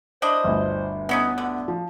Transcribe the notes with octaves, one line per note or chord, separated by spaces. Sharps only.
D4 E4 C5 D#5
G1 D2
E3 B3 C#4 D#4
D3
F3